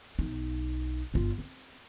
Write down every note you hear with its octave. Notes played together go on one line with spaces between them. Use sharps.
B1 D#4
G1 F4
C4